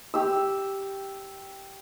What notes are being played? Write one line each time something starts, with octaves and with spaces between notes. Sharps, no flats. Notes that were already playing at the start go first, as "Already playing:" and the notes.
G4 E6